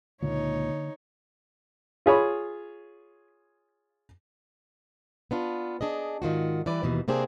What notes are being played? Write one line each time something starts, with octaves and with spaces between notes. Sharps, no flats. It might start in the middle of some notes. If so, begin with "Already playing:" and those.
C#2 A#2 D3 A#3 D#4 C#5
F4 G#4 C#5 B5
B3 D4 F4
D4 G#4 D#5
G#2 D#3 F4 F#4
E3 G3 B4 D5
D#2 B2 E3
C3 A#3 C4 D4 G#4